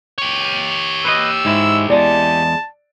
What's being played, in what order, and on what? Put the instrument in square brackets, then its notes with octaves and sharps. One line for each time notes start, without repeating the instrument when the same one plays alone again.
[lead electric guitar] G4 C#5
[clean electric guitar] B4 C5 D#5 [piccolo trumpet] E6
[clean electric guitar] G#2 G#3 E4
[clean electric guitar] E2 E3 G#3 [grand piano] D5 [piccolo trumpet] A5